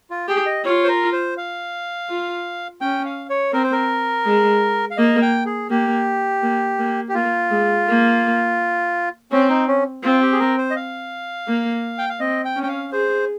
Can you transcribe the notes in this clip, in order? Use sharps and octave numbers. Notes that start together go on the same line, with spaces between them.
F4
G4 G#4
D#5
F4 C#5
C5
A#4
C5
F5
F4
C#4 G5
F5
C#5
C4 A#4
C5
A#4
G#3
F5
A#3 D#5
G5
G#4
A#3 G4
A#3
A#3
G4
A#3 F4
G#3
A#3
C4 C#4
D#4
C#4
C4 F4
G4
G#4
A#4
C5
D#5
F5
A#3
G5
F5
C4 D#5
G5
C#4
G5
F5
G#4 C5